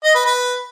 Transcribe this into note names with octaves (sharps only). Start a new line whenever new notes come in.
D#5
B4
B4